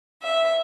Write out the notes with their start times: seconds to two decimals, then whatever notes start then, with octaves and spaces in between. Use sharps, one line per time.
0.23 E5